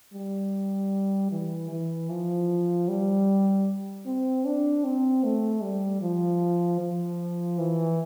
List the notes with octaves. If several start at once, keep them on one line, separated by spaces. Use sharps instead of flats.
G3
E3
E3
F3
G3
C4
D4
C4
A3
G3
F3
F3
E3